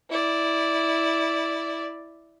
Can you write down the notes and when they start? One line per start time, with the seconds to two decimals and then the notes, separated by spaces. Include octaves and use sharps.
0.10 E4 D5